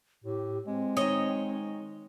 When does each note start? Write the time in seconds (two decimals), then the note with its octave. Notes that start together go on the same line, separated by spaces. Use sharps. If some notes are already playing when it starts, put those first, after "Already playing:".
0.24 A2 G4
0.67 G#3 C4
0.97 D#3 C#5 D#5